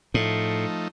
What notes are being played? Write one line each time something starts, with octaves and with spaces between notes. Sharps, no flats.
A2 F3 A3 D#4